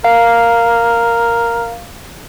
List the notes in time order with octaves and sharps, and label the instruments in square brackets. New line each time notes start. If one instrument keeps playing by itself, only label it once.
[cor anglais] A#4 [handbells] F5